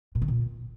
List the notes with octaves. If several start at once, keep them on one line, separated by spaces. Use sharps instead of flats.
A#2
D3
A#2